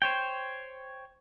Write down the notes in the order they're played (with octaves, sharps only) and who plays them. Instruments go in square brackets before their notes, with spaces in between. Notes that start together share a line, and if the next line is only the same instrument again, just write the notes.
[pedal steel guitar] C5 C#5 G5